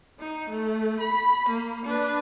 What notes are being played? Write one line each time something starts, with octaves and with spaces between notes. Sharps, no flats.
D#4
A3
B5
A#3
D4 B4